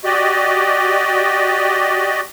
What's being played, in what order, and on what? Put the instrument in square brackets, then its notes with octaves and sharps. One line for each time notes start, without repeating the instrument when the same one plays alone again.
[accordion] F#4 G4 D5 D#5